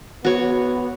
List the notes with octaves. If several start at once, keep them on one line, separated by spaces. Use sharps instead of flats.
B3 F#4 C#5